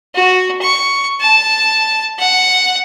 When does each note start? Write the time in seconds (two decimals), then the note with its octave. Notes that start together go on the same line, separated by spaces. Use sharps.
0.15 F#4
0.61 C#6
1.20 A5
2.19 F#5